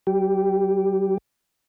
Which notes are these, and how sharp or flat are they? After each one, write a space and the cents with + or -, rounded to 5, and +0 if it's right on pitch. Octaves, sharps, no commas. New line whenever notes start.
F#3 +45 G4 +0